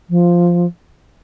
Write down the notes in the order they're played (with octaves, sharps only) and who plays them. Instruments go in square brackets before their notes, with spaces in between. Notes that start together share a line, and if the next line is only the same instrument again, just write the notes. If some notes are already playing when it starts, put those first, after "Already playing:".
[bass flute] F3